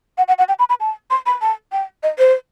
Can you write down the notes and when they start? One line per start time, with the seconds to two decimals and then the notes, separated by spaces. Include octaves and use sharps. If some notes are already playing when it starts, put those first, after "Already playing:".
0.18 F#5
0.28 F#5
0.38 F#5
0.48 G5
0.59 B5
0.69 B5
0.80 A5
1.10 C6
1.26 B5
1.41 A5
1.72 G5
2.03 D#5
2.18 C5